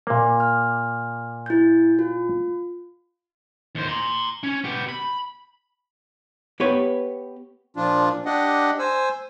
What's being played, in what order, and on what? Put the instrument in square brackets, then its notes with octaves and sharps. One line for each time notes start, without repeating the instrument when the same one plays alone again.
[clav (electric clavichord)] A#2 A#3
[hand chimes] F6
E4 G6
F4
[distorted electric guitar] D#2 C5
A#5 C6
C#4
B3 G4
B5
[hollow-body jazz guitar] B3 G4 B4 C#5
[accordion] A#2 F3 D4 F4
D4 G4 D#5 F#5
C5 G#5 E6